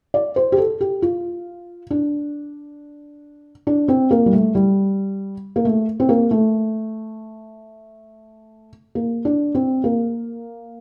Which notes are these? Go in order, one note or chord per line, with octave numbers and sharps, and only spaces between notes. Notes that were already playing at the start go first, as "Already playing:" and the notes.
D5
C5
G4
A4
G4
F4
D4
D4
C4
A#3
G3
A3
G3
A#3
A3
C4
A#3
A3
A#3
D4
C4
A#3